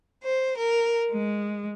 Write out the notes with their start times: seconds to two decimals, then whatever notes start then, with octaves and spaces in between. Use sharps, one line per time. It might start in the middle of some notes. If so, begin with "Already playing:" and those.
0.24 C5
0.58 A#4
1.12 G#3